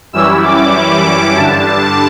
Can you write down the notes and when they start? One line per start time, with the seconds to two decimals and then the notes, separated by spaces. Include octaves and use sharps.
0.13 F#2 E3 G3 C#4 E4 E6
0.44 D6
1.36 G2 D3 G3 D4 A5